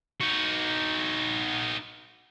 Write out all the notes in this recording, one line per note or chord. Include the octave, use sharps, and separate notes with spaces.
D#4 F#4